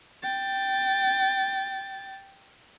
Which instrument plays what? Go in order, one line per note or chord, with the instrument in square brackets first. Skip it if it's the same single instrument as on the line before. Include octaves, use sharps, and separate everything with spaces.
[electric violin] G5 A6